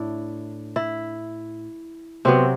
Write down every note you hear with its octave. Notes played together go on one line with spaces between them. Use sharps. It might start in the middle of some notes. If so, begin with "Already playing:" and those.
Already playing: A2 D4 E4
E4
C3 F#3 B3 C4